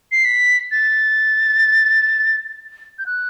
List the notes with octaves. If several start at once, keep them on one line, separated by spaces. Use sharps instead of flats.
C7
B6
A6
G6
F#6